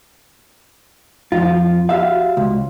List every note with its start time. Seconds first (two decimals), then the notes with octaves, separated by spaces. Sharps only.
1.32 F2 F4
1.89 F#4 G4 E5 F5
2.37 C#2